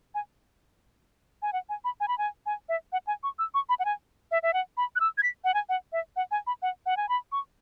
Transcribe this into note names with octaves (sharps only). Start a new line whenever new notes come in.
G#5
G#5
F#5
G#5
B5
G#5
B5
G#5
G#5
E5
F#5
G#5
C#6
E6
C#6
B5
F#5
G#5
E5
E5
F#5
B5
F#6
E6
G#6
B6
F#5
G#5
F#5
E5
F#5
G#5
B5
F#5
F#5
G#5
B5
C#6